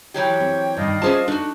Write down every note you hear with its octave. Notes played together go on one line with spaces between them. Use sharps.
E3 F#3 G4 C#5 G5
C4
G2 D#3 D5 D#5 F5
C#4 F4 G#4 C5 A5
D4 D#4 F#4 A4